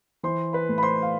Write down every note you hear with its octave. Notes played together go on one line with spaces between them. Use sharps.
E3 C5 C6
B4 B5
A2
B5
C5 C6
F5